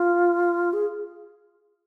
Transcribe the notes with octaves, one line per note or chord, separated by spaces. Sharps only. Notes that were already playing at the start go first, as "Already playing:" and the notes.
Already playing: F4
G#4